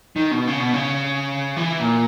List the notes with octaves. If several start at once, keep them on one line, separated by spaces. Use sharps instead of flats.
D#3
B2
C#3
B2
C#3
E3
A#2